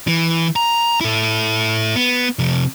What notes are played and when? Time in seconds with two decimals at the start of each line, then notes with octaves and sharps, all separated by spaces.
0.07 E3
0.56 A#5
1.01 E4 A4
1.96 B3
2.39 C3 F3